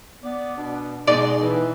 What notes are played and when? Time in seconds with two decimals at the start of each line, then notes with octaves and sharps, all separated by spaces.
0.23 B3 D5
0.56 B2 D4
1.07 B2 G#3 D#4 G#4 D5 C6
1.41 E3